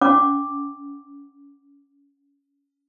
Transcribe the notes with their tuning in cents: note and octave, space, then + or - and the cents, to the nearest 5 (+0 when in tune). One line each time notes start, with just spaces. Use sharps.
C#4 +20 F#5 +0 D6 +0